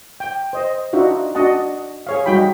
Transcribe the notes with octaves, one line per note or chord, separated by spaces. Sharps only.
G5
C5 D#5
D4 D#4 F4 F#4 E5
D4 F#4 D#5 F#5 A5
G#4 C#5 F5
G3 D#4 F#4 G5 B5